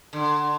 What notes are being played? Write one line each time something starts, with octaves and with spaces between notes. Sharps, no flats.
D3